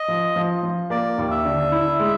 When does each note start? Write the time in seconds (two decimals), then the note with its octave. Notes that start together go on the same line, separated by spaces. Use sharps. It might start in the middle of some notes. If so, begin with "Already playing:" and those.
Already playing: D#5
0.08 F3
0.36 F3
0.63 F3
0.90 A#3 D5
1.18 D#2
1.31 E5
1.45 D3
1.72 E4
2.00 G#3